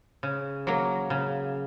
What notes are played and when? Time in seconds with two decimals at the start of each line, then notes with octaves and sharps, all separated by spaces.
0.23 C#3
0.67 F#3 A#3
1.10 C#3